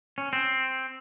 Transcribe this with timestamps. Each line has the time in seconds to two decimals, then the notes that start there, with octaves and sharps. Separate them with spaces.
0.18 C#4
0.33 C4